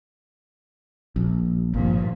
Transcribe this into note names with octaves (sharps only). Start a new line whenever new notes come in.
A#1
G#1 G2 A#2 F3